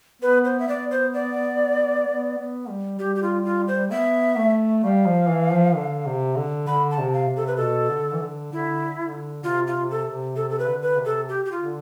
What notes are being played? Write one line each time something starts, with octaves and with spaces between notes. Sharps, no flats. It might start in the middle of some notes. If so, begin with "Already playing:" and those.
B3 B4
C5
E5
B3 D5
C5
D5
B3
B3
G3
G3 G4
G4
F4
F4
C5
B3 E5
A3
G3 F5
F3
E3
F3
D3
C3
D3
D3 B5
A5
C3
F5
C3
A4
B4
B2 A4
D3
E3
D3
D3 E4
D3
C3 F4
F4
C3
A4
C3
C3 A4
A4
B4
D3
B4
C3
A4
G4
G4
F4
D3